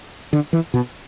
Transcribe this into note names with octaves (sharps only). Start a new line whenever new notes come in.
D3
E3
B2